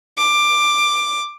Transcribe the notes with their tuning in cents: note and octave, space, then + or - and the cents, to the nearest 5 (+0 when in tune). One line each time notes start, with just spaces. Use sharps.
D6 +10